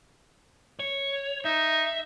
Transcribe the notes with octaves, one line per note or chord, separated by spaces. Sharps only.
C#5
D#4 E5